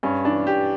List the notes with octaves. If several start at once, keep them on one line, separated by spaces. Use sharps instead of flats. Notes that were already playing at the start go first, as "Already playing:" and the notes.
G2 C#4
E3 D4
G2 G4